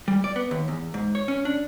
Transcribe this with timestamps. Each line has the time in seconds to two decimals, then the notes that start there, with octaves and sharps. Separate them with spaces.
0.08 G3
0.24 D5
0.36 B3
0.51 D#2
0.68 E2
0.94 G#2
1.15 C#5
1.28 C#4
1.45 D4